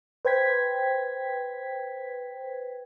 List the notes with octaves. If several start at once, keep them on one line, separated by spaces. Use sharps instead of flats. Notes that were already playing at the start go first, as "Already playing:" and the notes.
B4 C5 G5 G#6 B6